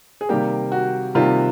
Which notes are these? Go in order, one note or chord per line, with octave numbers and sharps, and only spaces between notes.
G#4
C3 D#3 G3 A#3 G4
F#4
C3 D#3 G3 A#3 F4